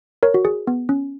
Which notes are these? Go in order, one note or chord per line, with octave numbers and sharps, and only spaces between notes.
A#4 C#5
F#4
G#4
B3
C#4